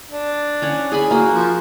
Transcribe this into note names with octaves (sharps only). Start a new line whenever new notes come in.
D4
C#4 C#5 F#5
G#4 G#5 B5
A#3 F#4
F3